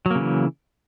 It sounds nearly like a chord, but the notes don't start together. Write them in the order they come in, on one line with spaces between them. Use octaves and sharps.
F#3 A#3 C#3 E3